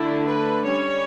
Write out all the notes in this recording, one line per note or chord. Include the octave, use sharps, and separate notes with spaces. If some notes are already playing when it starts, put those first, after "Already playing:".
Already playing: D3 A3 D4 E4
B4
G3 C#4 C#5